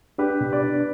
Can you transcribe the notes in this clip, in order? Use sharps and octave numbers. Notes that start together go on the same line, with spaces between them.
D4 G4 B4
B2
B4 D5
D4